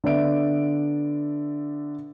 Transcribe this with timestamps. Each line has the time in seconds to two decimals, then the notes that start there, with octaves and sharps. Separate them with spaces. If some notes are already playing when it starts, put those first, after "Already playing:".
0.04 D3 B3 D5 E5 D7